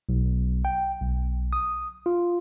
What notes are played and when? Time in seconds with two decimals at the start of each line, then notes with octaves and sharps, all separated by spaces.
0.09 B1
0.65 G5
1.00 B1
1.53 D#6
2.06 F4